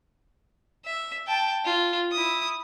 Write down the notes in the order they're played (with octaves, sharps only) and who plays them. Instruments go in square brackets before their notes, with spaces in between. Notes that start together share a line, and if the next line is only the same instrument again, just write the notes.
[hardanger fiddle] E5
G5 A5
F4
E4 D#6